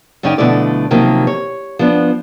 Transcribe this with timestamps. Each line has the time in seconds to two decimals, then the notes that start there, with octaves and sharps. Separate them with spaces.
0.23 F#2 C#3 C#4 D#4 D5 G5
0.38 B2 D3 F3 A3 E4 D5
0.91 C3 D#3 F3 F#3 A#3
1.27 C#5
1.79 F3 B3 D4